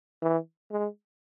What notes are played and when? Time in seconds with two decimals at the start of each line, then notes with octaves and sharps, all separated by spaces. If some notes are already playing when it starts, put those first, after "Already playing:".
0.22 E3
0.71 G#3